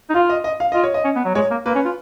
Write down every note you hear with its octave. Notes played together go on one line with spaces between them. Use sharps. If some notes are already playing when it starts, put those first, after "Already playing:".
D#4
F4 F5
D#5
D#5
F5
F4 D#5
C#5
D#5
C#4
B3
F#3
G#3 C#5
A#3
A#3 B4
C#4
F4